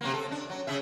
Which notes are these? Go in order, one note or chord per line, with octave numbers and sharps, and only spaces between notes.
C3 F#3 A#3
A4
D4
F#3
C#3 G#4 E5